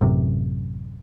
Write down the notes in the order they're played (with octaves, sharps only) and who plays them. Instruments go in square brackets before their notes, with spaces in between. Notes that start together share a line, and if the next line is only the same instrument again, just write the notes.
[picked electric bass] A1 F#2 C3